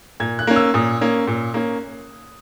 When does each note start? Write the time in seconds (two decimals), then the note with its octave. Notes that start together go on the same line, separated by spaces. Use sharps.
0.20 A#2 G#6
0.39 F#6
0.47 A#3 C#4
0.56 E6
0.74 A#2 D#6
1.01 A#3 C#4
1.27 A#2
1.54 A#3 C#4